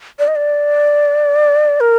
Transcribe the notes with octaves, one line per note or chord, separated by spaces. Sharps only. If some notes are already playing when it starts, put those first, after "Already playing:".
D5
D#5
D5
A#4